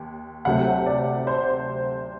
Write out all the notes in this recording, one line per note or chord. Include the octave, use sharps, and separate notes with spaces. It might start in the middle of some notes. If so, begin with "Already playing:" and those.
Already playing: D#2
D2 C3 F#3 A3 F#5
D5
C5